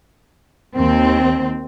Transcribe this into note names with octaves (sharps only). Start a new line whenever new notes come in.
D#2 C4